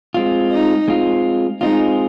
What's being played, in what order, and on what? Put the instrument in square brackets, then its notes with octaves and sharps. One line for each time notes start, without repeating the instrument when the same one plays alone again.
[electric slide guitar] G#3 C4 F4
[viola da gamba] D#4
[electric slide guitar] G#3 C4 F4
[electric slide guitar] G#3 C4 F4 [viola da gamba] D#4